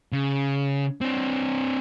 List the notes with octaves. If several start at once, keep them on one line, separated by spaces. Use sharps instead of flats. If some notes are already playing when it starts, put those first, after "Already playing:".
C#3
C4 D4